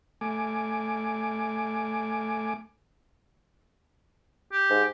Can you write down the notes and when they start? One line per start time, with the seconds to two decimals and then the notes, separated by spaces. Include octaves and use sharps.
0.21 A3 G#5 D6
4.52 G4
4.70 G#2